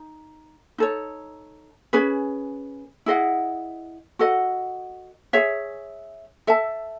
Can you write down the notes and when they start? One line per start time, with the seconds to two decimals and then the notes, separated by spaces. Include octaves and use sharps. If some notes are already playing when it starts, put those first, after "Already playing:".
Already playing: D#4
0.78 D#4 A4 C#5
1.93 C#4 G#4 B4
3.06 E4 G#4 D#5 F#5
4.19 F#4 A4 D#5 F#5
5.33 G#4 C#5 E5
6.47 A4 E5 A5